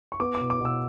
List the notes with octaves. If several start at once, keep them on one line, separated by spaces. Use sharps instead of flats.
C#6
B3 D6
D6
B2
D6
B2 E6